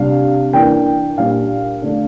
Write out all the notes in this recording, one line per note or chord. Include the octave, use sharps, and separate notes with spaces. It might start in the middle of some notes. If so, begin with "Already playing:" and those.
Already playing: C3 G3 D4 F5
E3 A#3 D4 G5
A#2 G3 D4 F5
D3 A3 D4